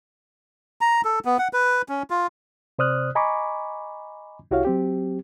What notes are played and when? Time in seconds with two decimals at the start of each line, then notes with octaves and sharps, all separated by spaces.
0.81 A#5
1.05 A4
1.25 B3
1.39 F#5
1.53 B4
1.89 C#4
2.10 F4
2.79 C3 C5 D5 D#6 F6 F#6
3.15 D#5 G#5 A#5 B5 C#6 D6
4.51 C2 E4 F#4 G4 C#5 F5
4.65 F#3 C4 G4